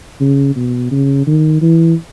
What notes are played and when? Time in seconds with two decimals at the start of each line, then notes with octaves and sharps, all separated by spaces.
0.20 C#3
0.56 B2
0.91 C#3
1.27 D#3
1.62 E3